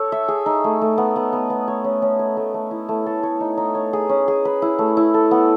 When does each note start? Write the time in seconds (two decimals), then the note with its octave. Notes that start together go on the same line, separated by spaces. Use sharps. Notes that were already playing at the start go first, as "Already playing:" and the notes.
Already playing: A4 C#5
0.12 E5
0.28 G#4
0.46 D#4
0.64 A3
0.81 A3
0.98 B3
1.16 B3
1.33 B3
1.50 B3
1.68 C#5
1.84 C#4
2.02 C#4
2.19 C#5
2.37 A3
2.54 A3
2.71 E4
2.89 A3
3.06 A4
3.23 C#5
3.40 D#4
3.57 D#4
3.75 C#5
3.93 G#4
4.09 C#4
4.28 G#4
4.45 B4
4.62 E4
4.79 A3
4.97 E4
5.14 A4
5.31 B3